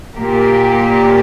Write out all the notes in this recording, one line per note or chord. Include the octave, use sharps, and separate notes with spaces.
A#2 A#3 G4